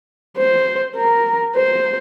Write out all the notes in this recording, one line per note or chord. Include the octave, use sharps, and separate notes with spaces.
C5
A#4
C5